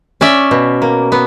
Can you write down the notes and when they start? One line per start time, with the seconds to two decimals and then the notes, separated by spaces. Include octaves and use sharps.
0.21 C#4 D5 E5
0.51 B2
0.82 A#3
1.12 B3